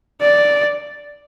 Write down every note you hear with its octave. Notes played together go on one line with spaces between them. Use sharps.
D5